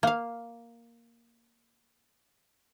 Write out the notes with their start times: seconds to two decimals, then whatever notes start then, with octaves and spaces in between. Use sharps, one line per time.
0.03 A#3 F5